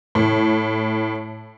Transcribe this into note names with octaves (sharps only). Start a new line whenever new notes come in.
A2